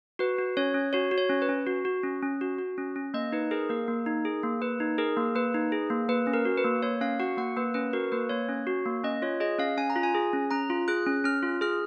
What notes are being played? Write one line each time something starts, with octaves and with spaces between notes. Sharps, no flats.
F#4 B4
F#4
C#4 C#5
C#4
F#4 C#5
F#4
C#5
C#4
B4
C#4
F#4
F#4
C#4
C#4
F#4
F#4
C#4
C#4
A#3 D#5
D#4 B4
G#4 A#4
A#3 A#4
A#3
D#4
G#4
A#3
A#3 B4
D#4
G#4 A#4
A#3
A#3 B4
D#4
G#4
A#3
A#3 B4
C#4
A#4
F#4
B4
A#3
A#3 C#5
C#4 F5
F#4 F#5
A#3 F#5
A#3 B4
C#4 B4
F#4 A#4
A#3 B4
A#3 C#5
C#4
F#4
A#3
C#4 D#5
F4 C#5
G#4 D#5
C#4 F5
C#4 G#5
A#5
F4
G#5
G#4
C#4
C#4 A#5
F4
G#4 F#6
C#4
C#4 F6
F4
G#4 F6